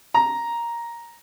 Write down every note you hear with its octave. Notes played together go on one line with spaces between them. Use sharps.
A#5